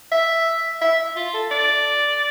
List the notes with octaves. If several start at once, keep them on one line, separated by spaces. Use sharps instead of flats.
E5
E5
F4
A4
D5